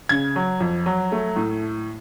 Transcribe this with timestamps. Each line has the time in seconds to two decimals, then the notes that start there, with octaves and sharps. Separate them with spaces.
0.09 C#3 G#6
0.36 F#3
0.60 F2
0.86 F#3
1.12 A3
1.36 A2